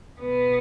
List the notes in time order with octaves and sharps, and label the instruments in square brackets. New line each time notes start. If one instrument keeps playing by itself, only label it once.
[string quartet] B2 B3